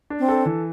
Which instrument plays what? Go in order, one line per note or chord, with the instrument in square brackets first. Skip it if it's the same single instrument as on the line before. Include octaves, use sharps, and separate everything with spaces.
[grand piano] D4
[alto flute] C4
[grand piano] A4
E3